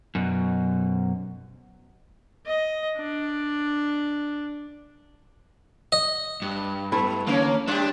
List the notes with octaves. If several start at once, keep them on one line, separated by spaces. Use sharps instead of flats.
F#2 B2
D#5
D4
D#5
G2
A3 B3 E4
D3 A#3 C#4 C#5
G3 D4 G4